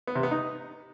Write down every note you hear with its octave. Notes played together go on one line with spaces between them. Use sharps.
B3
C3
B3
D#4